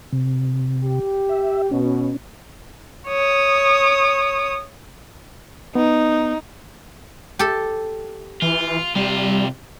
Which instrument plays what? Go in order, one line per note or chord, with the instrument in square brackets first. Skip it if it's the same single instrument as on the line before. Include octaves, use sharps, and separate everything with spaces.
[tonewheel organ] C3
[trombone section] G4
[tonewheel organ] E5
[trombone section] B2 [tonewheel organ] C#4
[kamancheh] C#5 D#6
[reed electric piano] B3 [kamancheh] D#4
[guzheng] G4 A4
[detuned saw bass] E3 [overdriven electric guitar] F4
[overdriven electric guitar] C3 F4 [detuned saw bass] G3